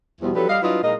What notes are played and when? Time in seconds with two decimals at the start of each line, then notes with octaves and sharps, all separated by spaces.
0.21 E2 B2 E3 F3 G3 B3
0.34 F3 F#3 D4 G4 A4 B4
0.49 G3 D5 D#5 F5
0.62 F#3 D4 E4 F4 B4 D#5
0.83 A#2 G#3 D#4 A#4 D#5